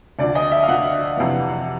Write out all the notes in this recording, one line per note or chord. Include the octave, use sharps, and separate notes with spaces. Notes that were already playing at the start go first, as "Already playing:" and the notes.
D2 D3 F3 D5
D#5
E5
F5
D2 D3 F3 F#5
F2 C3 E3